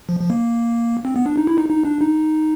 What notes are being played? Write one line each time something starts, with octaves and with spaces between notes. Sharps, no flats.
F3
F3
A#3
C4
B3
D4
D#4
E4
D#4
D#4
D4
D#4